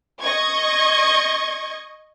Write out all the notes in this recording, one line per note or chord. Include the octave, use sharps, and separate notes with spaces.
D#5 C#6 G#6